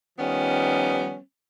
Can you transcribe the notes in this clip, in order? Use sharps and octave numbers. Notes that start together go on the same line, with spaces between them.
D#3 F3 G3 B3 C#4